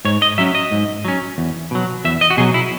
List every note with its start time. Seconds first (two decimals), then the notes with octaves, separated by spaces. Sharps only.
0.05 G#2 C#5
0.22 D#5
0.38 F#3 C#4 E5
0.55 D#5
0.71 G#2
1.05 F#3 C#4
1.38 E2
1.71 B2 F#3
2.05 E2 E5
2.21 D#5
2.30 F#4
2.37 B2 F#3 G#4
2.54 E4